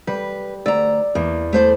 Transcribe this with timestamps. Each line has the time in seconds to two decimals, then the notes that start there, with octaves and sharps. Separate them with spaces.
0.07 G3 B4
0.66 D2 D5 A#5 E6
1.15 E2 A#3
1.53 A3 C5 D5